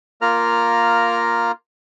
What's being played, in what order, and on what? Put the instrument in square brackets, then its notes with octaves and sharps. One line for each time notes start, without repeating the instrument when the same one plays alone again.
[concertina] A#3 F4 A#4 A#5 F6